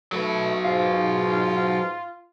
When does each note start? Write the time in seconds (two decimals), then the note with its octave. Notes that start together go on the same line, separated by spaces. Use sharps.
0.12 F#3 A3 B4
0.64 G#2 F4 F5